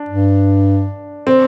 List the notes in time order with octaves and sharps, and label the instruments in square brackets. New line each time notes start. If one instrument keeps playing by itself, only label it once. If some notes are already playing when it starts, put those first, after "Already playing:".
Already playing: [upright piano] D4
[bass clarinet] G2
[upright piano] C4